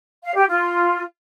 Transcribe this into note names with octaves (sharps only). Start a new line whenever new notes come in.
F5
G4
F4